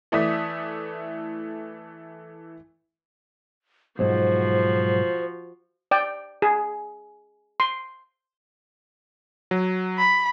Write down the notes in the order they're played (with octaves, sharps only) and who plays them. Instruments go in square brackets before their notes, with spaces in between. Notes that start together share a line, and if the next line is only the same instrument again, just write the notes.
[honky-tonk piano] E3 A3 D5 D#6 B6
[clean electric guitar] B1 G#2 [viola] F3 F#4 [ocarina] C5
[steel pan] D5 G5
G#4
C6
[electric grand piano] F#3
[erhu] B5